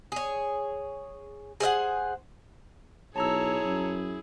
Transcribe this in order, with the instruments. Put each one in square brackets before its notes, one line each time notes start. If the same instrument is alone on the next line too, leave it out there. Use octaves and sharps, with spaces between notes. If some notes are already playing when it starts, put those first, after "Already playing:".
[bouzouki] G#4 C#5
G#4 C5 E5 F#5
[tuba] B1 [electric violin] E4 G#4 [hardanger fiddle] C#5 [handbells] A5 A#5 E6
[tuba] F#2